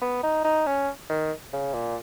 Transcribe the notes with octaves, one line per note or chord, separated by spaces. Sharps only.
B3
D#4
D#4
C#4
D#3
C#3
A#2